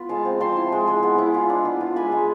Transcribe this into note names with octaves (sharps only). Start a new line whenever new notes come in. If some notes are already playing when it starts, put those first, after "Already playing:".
Already playing: B3 F4 B5
G#3 F5 A5
C4
F3 A5 C6
E4
G#3
G#3
B3
E4
F4
D4
B3
F4
G#3 G#5 B5
G#3